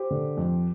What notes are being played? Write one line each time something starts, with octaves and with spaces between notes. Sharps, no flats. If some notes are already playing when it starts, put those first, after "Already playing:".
Already playing: G4 C5
D3
F2